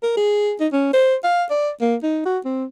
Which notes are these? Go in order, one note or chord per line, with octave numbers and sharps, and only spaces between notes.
A#4
G#4
D#4
C#4
C5
F5
D5
A#3
D#4
F#4
C4